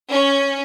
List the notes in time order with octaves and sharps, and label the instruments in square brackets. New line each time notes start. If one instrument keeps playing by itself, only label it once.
[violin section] C#4